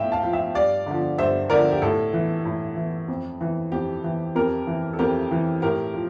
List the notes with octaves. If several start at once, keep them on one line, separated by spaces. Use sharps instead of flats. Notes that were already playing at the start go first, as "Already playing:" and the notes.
Already playing: A2 F3 E5 F5 G5
F5 A5
F3
E5 G5
G2 D5 F5
D3 F3
G2 C5 E5
D3 F3 A#4 D5
G4
A2 A4
E3
A2
E3
F2
E3
F2 G4
E3
F2 G4 A#4
E3
A4
F2 G4 A#4
E3
A2 G4 A#4
F3